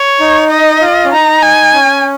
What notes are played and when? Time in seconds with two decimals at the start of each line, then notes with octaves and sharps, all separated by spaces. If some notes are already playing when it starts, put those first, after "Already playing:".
Already playing: C#5
0.20 D#4
0.50 D#5
0.81 F4
1.05 C#4
1.12 D#4 A#5
1.42 G#5
1.74 C#4